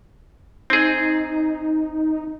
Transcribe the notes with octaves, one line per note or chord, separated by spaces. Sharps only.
C4 D#4 G#4